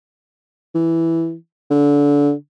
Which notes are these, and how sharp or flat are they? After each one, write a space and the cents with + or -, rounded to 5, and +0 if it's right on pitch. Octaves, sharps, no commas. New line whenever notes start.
E3 +0
D3 -25